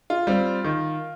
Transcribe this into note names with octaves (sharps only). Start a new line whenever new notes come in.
F4
G3 C4
D#3